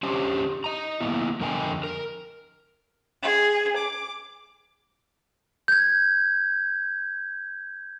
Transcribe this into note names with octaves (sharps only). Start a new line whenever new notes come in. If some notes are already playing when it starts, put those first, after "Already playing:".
C#4 D4 G4 C5
D#5 A#5
A#3 B3 E4
F2 D3 A#4 D#5 G5 G#5
A#4
G#4
D6
G6 G#6